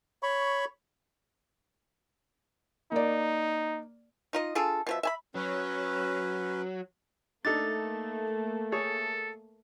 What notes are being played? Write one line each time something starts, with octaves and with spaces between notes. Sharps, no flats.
C#5 B5 C#6
A#3 D#4 D5
D#4 F4 D#5
D4 F4 G#4 A4
B2 F3 E5
E5 G#5 B5
F#3 C#4 B4
A3 A#3 D4 D#4 A4 A6
G#4 A4 C#5